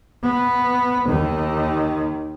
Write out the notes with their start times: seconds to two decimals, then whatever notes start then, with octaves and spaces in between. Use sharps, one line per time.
0.23 B3
1.08 D#2 D#3